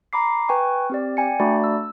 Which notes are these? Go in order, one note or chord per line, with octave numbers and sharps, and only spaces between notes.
A#5 B5 D6 C7
B4 G5 G#5 C#6
C4 G4 D5
D5 G5 G#5 C#7
A3 D4 F#4 D5 B5
E6